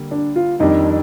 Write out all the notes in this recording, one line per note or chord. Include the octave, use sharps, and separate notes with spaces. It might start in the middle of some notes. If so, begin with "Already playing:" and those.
Already playing: D3 G3 A#3
D4
F4
F2 D#3 G3 D4 D#4